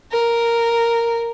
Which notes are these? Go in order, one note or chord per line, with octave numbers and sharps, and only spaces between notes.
A#4